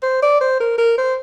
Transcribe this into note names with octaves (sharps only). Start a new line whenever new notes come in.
C5
D5
C5
A#4
A#4
C5